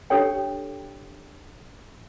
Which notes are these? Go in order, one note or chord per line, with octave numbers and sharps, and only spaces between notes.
D4 G4 A4 C#5 G5